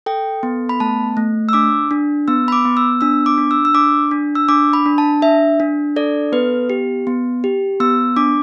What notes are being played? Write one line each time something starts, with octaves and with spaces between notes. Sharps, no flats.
A4 G5
B3
B5
A3 A5
A3
E6
D4 D6
D4
B3 E6
B5
D6
B3
E6
D4 E6
D6
D4
E6
E6
D4 D6
D4
E6
D4 D6
B5
D4
A5
D4 E5
D4
A4 D5
B3 B4
G4
B3
G4
B3 E6
D4 D6